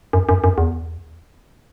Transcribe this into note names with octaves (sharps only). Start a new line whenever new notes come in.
F#2
F#2
F#2
E2